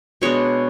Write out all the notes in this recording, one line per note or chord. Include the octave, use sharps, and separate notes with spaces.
B2 G#3 B3 D4 C#5